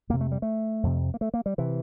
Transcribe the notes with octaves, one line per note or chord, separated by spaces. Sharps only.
F2 C3 A#3
A3
G3
A3
F2 C3
A#3
A3
A#3
G3
C3 E3